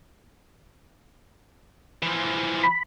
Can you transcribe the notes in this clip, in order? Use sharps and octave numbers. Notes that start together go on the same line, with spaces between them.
E3 F3
B5